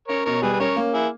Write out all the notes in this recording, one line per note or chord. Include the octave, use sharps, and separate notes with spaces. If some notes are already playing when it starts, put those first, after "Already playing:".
C#4 A#4 C#5
B2 A#4 C#5
G3 G#4 B4
B4
C#4 A#4 C#5
A#3
E4 G#4